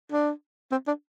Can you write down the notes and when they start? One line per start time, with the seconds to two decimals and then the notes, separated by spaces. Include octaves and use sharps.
0.12 D4
0.71 C4
0.87 D4